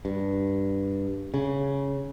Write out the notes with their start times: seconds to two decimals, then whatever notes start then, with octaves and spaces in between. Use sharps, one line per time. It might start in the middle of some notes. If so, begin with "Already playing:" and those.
0.05 G2
1.34 C#3